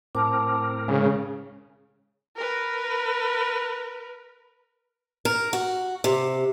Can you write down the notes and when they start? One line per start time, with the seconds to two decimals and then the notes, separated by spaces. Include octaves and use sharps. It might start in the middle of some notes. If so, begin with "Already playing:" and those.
0.15 A2 C4 A#4 A5 D6
0.88 C#3 G#3
2.36 A#4 B4
5.25 A#4
5.53 F#4
6.04 C3